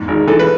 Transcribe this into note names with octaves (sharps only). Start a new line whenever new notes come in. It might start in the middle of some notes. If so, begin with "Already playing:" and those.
Already playing: E2 G#2
G#1
E3 A4
B4